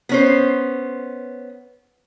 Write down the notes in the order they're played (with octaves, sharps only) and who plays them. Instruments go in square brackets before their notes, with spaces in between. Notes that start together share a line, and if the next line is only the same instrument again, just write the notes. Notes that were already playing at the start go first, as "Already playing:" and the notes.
[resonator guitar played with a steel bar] B3 C#4 C5